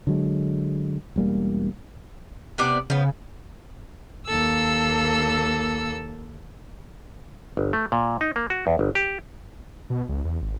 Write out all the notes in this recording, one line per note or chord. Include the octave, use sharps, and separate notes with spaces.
D3 F#3 G#3
E1 G3 A#3
C3 B3 D5
C#3 F3 B3
D#2 A#3 A4 E6
G1
A3
A#2
D#4
A#3
F#4
E2
G1
G4
B2
C#2
E2
G#1